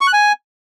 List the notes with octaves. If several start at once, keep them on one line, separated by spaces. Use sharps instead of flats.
C#6
F#6
G#5